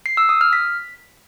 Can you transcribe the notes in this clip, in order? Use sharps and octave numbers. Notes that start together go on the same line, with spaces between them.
C7
E6
D#6
F6
B6